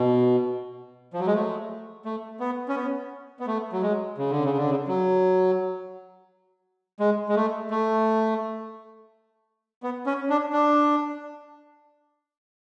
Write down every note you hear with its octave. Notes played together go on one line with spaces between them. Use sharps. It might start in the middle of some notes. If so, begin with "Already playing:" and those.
Already playing: B2
F3
F#3
G#3
A3
A3
B3
C#4
B3
B3
A3
F#3
G#3
C#3
D3
C#3
D3
C#3
F#3
G#3
G#3
A3
A3
B3
C#4
D4
D4